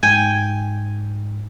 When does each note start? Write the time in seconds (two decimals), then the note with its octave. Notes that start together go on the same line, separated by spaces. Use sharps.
0.03 G#2 G5 G#5